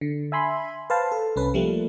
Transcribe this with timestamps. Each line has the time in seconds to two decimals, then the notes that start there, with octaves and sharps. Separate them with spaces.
0.01 D3
0.32 E5 G#5 B5 C6
0.90 B4 C5 F5 A5
1.12 A4
1.36 C2 C#4 B4
1.54 F3 G3 A3 A#3